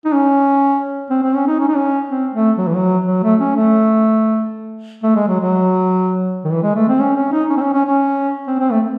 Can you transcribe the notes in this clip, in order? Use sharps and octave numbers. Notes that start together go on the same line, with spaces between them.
D#4
C#4
C4
C4
C#4
D#4
C#4
D#4
C#4
C4
A3
F#3
E3
F#3
F#3
A3
C#4
A3
A3
G#3
F#3
F#3
D#3
E3
G#3
A3
C4
C#4
C#4
D#4
C#4
C4
C#4
C#4
C#4
C4
C4
A3